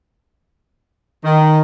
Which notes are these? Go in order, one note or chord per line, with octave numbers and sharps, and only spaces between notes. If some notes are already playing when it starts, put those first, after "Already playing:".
D#3